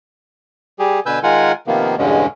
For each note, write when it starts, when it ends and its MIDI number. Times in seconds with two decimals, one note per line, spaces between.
0.79 1.00 55
0.79 1.00 67
0.79 1.00 68
1.06 1.19 47
1.06 1.19 50
1.06 1.19 71
1.06 1.19 80
1.06 1.19 88
1.06 1.19 91
1.23 1.52 51
1.23 1.52 56
1.23 1.52 65
1.23 1.52 70
1.23 1.52 78
1.23 1.52 80
1.67 1.95 48
1.67 1.95 51
1.67 1.95 53
1.67 1.95 58
1.67 1.95 59
1.98 2.26 40
1.98 2.26 43
1.98 2.26 47
1.98 2.26 50
1.98 2.26 56
1.98 2.26 61